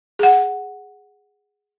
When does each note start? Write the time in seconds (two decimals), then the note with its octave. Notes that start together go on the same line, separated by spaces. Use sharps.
0.19 G#4 F#5